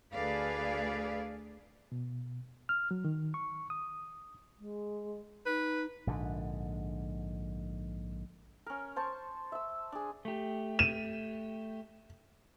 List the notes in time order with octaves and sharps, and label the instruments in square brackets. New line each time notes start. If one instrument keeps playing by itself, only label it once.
[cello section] D2 G#4 A4 B4 D5 F5
[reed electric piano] B2
F6
F#3
D#3
C#6
D#6
[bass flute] G#3
[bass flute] D#4 [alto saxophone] B4
[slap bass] A#1 G#2 B2 D3
[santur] C#4 A#4
C5 A5 C#6
E5 E6
D4 G#4
[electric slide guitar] A3 G4
[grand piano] D#7 E7